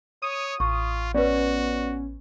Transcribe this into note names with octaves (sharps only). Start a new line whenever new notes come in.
C#5 D#6
A1 F4 C#6
B3 C#4 F#4 B4 D5